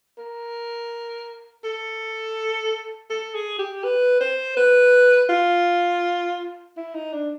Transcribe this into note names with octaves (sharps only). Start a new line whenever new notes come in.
A#4
A4
A4
G#4
G4
B4
C5
B4
F4
E4
D#4
D4